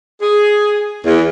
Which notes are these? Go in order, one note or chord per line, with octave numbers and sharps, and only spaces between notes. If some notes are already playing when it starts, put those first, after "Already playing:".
G#4
E2